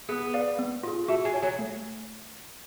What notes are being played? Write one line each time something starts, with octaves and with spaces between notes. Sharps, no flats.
B3 G#4
B4 D5 F5
B3
F4 G#4
A3 F#4
G#3
C#5 G#5
F#3
A3